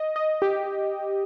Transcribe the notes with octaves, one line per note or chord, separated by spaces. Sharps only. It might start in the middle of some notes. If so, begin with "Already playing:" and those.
Already playing: D#5
D#5
G4